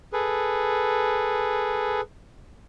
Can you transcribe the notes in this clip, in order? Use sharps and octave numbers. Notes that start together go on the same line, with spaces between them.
G#4 A4 B4